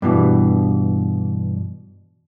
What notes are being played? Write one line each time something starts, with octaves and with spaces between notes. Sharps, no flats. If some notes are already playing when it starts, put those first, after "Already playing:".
G2 B2 E3